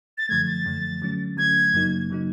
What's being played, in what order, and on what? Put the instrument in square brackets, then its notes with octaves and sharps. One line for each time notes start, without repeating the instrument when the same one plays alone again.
[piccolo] A6
[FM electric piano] F#2 D3 F3 A3 [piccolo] G#6
[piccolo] A6
[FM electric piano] F#2 D3 F3 A3
D3 F#3 A3 C#4
[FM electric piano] D3 F#3 A3 C#4 [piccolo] G#6
[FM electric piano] F#2 C#3 F#3 A#3 D#4
C#3 F#3 A#3 D#4